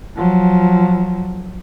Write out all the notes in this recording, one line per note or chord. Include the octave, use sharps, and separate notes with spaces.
F3 F#3